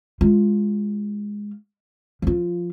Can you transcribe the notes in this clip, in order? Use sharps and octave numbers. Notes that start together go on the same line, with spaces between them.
G#3 F4
F3 F4